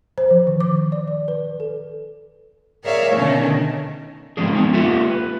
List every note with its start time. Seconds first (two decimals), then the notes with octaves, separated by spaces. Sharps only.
0.18 C5
0.31 F3
0.47 D#3
0.60 D6
0.92 D5
1.07 D5
1.28 B4
1.60 A4
2.85 G#4 A#4 C#5 D5 E5 F5
3.15 B2 D3 D#3 A3 C#4
4.37 D3 F3 G#3 C#4 D4 G#4
4.54 G#3 B3 C#4 D#4
4.73 A#3 F4 G4 A4 E5 F#5
5.10 B4